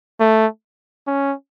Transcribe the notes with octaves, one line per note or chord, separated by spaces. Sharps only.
A3
C#4